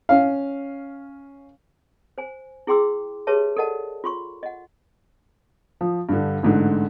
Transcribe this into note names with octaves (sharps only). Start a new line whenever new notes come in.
C#4 F5
C5 G#5
E4 G#4 G5 C6 D6 E6
G4 G#4 B4 C#5 E5 A5
A4 A#4 D5 D#5 F#5 A5
F4 C6 C#6
D#5 F#5
F3
G2 D3
A1 G#2 D3